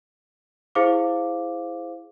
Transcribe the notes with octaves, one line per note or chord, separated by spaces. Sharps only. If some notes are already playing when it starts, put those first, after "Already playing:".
E4 G#4 C5 F5 D6